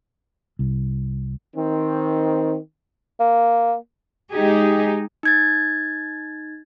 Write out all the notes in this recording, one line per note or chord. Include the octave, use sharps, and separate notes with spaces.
C2
D#3 C4
A#3
G#3 D#4 G4 G#4
D#4 G#6 A6